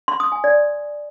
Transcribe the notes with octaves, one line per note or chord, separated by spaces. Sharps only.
C6
D#6
G#5
D5